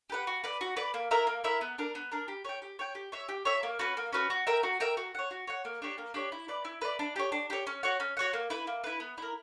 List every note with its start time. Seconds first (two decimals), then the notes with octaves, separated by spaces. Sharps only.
0.10 G4 B4 F#5
0.27 F#4
0.44 B4 D5
0.61 F#4
0.77 B4 D5
0.94 A#3
1.11 E4 A#4 E5
1.27 A#3
1.44 E4 A#4 E5
1.61 B3
1.78 D4 A#4
1.95 B3
2.11 D4 A#4
2.28 G4
2.45 C#5 G5
2.62 G4
2.79 C#5 G5
2.95 G4
3.12 C#5 E5
3.29 G4
3.45 C#5 E5
3.63 A#3
3.79 C#4 F#4 B4
3.97 A#3
4.13 C#4 F#4 B4
4.30 F#4
4.47 A#4 E5 G5
4.63 F#4
4.80 A#4 E5 G5
4.97 F#4
5.15 C#5 F#5
5.31 F#4
5.47 C#5 F#5
5.65 A#3
5.82 D4 G4 C#5
5.98 A#3
6.14 D4 G4 C#5
6.32 E4
6.48 B4 D5
6.65 E4
6.81 B4 D5
6.99 D4
7.16 G4 C#5
7.32 D4
7.50 G4 C#5
7.67 C#4
7.83 F#4 C#5 F#5
8.00 C#4
8.17 F#4 C#5 F#5
8.33 A#3
8.50 E4 B4
8.67 A#3
8.84 E4 B4
9.00 B3
9.18 E4 A#4